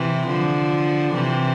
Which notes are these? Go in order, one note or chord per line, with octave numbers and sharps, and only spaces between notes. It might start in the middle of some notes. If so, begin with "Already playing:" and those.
Already playing: C3 E3
D3 F3
C3 E3